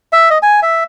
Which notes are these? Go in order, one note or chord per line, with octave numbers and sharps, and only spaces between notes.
E5
D#5
G#5
E5